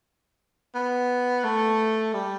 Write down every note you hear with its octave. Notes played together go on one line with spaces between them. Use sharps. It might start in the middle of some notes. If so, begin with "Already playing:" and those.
B3
A3
G3